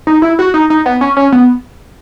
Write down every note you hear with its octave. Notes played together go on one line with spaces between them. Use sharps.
D#4
E4
F#4
D#4
D#4
B3
C#4
C#4
B3